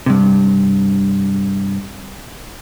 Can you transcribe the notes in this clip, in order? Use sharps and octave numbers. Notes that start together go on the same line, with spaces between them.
G2 C3